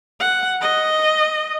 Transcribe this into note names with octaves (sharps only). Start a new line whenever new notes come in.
F#5
D#5